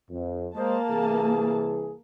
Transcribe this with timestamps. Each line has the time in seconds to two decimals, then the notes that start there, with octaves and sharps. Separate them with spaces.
0.10 F2
0.55 G#3 A#3 C5 D#5 A5
0.90 C2 E3 G#4